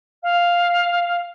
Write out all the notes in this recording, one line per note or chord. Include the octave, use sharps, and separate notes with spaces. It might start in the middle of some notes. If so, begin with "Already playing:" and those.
F5